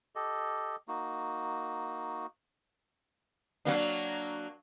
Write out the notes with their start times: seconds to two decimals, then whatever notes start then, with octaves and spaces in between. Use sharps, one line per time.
0.16 G4 A4 D#5
0.88 A#3 D#4 F#4
3.65 F#3 A#3 D4